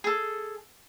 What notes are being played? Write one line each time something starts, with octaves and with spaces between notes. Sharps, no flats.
G#4 A4